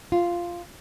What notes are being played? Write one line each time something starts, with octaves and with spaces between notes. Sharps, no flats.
F4